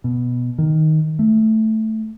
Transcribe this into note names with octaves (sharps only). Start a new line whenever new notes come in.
B2
D#3
A3